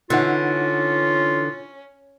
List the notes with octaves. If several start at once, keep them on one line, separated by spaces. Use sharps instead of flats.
D3 E3 C#4 D#4 F4 F#5